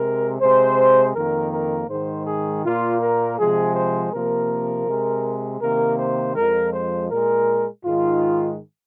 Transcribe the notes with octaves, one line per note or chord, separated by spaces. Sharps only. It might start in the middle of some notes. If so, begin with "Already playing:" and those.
Already playing: C3 G#3 A#4
C3 G#3 C5
F2 D#3 A#3 A#4
A#4
G#2 D#3 G#3 C5
G#4
A#2 A#3 F4
A#4
C3 F3 G#3 G#4
C5
C3 F3 A#3 A#4
C3 G#3
C3 D#3 A#3 A#4
C5
F2 F3 G#3 A#4
C5
A#2 G#3 A#4
G#2 D#3 G#3 F4